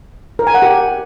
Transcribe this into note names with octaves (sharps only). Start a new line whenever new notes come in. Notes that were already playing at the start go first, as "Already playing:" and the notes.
A#4
G#5
F#5
G4